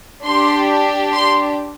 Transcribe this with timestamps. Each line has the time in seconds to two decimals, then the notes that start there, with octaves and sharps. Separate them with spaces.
0.24 D4 G4 C6
1.13 C6